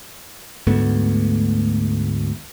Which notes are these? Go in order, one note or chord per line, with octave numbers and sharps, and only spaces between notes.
D2 G#2 A3 B3